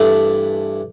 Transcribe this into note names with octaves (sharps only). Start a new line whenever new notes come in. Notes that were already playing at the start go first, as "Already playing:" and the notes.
Already playing: G2 E3 A3 D4